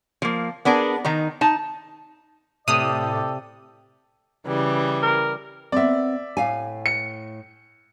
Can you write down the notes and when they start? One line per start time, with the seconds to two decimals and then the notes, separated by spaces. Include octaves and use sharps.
0.22 F3 A#3
0.65 B3 D4 G#4 A#4
1.05 D#3 D#4 A#5
1.41 D#4 A5
2.68 A2 C3 G4 A4 D5 D#6
4.47 C#3 E3 G3
5.03 A#4
5.72 B3 C4 D5 E5
6.37 A2 F5 G#5
6.86 C#7